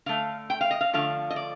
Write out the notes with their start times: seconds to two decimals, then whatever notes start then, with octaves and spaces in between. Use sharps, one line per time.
0.06 D3 A3 F5
0.50 G5
0.61 F5
0.71 D#5
0.81 F5
0.93 D3 F3 A3 F5
1.30 D#5
1.36 D5